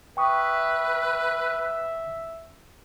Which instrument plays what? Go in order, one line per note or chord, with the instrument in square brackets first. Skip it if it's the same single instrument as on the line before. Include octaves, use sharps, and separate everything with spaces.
[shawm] B4 [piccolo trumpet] E5 [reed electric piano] G5 C#6 D#6